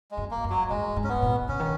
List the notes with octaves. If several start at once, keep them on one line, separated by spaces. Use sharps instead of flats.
G#3
F#2
A#3
F#2
F#3
G#2 G#3
G#2
C#4
B3
A#2
C#3 C#4
D#3